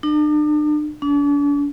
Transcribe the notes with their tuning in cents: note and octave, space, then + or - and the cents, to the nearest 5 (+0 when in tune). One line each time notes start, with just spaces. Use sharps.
D4 +40
D4 -40